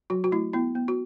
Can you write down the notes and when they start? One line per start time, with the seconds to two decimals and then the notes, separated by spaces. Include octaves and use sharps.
0.10 F#3 F#4
0.24 F#4
0.32 A3 E4
0.53 B3 E4
0.75 B3
0.88 F#4